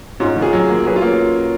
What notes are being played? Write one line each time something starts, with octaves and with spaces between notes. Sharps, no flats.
G#2 C#4 F4
D#3
F4 G#4
F#3
A#3
F#3 G#4 B4
C#4 F4
A#3